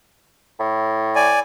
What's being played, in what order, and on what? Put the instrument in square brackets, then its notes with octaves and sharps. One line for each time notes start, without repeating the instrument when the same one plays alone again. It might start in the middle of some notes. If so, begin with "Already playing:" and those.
[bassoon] A2
[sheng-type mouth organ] D5 G#5